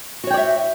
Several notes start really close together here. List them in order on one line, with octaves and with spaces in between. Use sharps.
F#4 C#5 G5 D5 E5